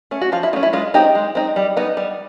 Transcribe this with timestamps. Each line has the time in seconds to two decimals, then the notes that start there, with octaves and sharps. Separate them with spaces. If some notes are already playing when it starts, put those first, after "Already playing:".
0.11 A3 C#4
0.21 F#4
0.32 F3 F4
0.43 E4
0.53 A3 D#4
0.56 C#4
0.63 E4
0.73 G#3 F4
0.94 C4 D#4 G4
1.15 G#3
1.35 C4 D#4
1.56 G3
1.77 B3 D#4
1.97 G3